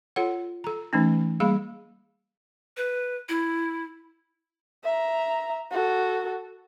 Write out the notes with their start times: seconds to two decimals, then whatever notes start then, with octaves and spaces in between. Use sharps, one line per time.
0.16 F4 A4 C#5 F#5
0.64 A4 A#5
0.93 E3 A3 C#4 D#4
1.40 G3 A#3 G#4 F5 B5
2.77 B4
3.29 E4
4.84 E5 A#5
5.71 F#4 A4